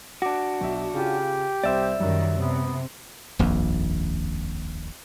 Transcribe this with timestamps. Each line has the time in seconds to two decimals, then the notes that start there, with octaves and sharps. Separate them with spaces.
0.22 D4 F#4 D6
0.61 B1 E5
0.94 C#3 F4 G4
1.64 C2 C4 C5 D5 E5
2.00 F#2 D#3 F#3 G3
2.40 C3 B3
3.39 D#1 A#1 F2